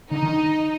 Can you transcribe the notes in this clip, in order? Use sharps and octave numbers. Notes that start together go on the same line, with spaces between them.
D3 D#4
D#3